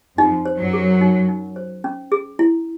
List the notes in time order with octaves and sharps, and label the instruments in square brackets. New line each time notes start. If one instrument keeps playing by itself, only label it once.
[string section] F2 F3 [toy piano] D#4
[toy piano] C5
[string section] F#2 F#3
[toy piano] G#4
D#4
D#4
C5
C#4
G#4
E4